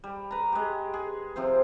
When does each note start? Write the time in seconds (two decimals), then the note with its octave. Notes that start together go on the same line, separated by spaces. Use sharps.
0.04 G3
0.31 B4 A#5
0.52 G#3 G4
0.94 G#4
1.36 C3 F3 C4 C5